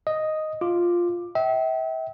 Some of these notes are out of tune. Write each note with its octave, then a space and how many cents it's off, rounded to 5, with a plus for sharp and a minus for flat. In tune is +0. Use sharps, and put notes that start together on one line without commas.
D#5 +0 D#6 +0
F4 +0 D6 +10
E5 -35 G5 -30